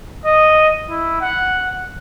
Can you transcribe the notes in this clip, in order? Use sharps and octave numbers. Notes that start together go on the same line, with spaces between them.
D#5
E4
F#5